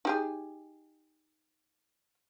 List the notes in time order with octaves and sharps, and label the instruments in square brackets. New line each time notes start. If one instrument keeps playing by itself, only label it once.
[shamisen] D#4 G4 G#4